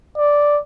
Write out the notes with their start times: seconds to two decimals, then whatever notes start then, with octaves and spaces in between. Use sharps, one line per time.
0.17 D5